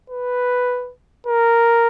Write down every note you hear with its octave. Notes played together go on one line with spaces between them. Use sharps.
B4
A#4